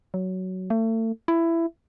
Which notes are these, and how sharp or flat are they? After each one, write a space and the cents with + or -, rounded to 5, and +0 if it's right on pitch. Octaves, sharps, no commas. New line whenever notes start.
F#3 +10
A3 +35
E4 +15